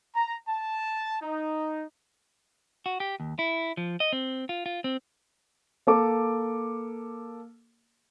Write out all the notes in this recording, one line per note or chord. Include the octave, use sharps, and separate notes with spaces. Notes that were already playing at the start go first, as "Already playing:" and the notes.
A#5
A5
D#4
F#4
G4
D#2
E4
F3
D#5
C4
F4
F4
C4
A#3 A4 D6